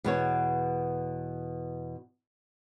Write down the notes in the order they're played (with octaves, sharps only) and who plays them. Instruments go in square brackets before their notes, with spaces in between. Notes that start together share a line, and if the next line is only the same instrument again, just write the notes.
[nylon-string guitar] E2 B2 C#5